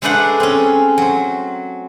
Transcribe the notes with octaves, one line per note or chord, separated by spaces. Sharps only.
G#3 A3 D4 B4 C5 F#5
C4 C#4
F#3 C5